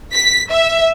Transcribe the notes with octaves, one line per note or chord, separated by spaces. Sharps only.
B6
E5